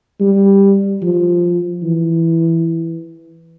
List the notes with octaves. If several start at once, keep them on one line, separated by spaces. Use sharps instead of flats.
G3
F3
E3